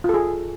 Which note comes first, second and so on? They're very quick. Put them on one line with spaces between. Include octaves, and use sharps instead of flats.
F4 A4 G#4